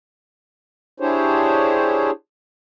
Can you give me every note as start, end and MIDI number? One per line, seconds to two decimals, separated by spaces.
1.00 2.11 62
1.00 2.11 64
1.00 2.11 67
1.00 2.11 68
1.00 2.11 72
1.00 2.11 73